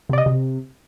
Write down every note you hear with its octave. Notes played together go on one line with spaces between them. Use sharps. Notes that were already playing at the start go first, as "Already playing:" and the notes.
C3 D5
D#5
C3